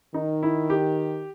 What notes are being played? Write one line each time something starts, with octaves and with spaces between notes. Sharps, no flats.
D#3 D#4
E4
G4